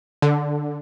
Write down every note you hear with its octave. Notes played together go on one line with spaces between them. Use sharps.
D3